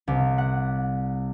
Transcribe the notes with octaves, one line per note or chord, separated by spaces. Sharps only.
C2
F#5